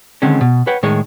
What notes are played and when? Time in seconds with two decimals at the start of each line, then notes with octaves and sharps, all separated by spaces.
0.22 D3 D#3 G#3 C4 C#4
0.41 B2
0.67 B4 C#5 F#5 G5
0.83 A2 D#3 G#3 G#4 C#5